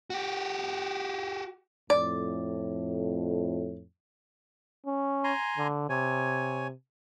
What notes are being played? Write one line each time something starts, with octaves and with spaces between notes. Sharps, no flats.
F#4 G4
F2 A2 D5
C#4
G#5 A#5 C6
D3
C3 C#5 G#5